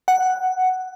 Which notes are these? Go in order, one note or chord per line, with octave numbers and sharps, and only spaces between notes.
F#5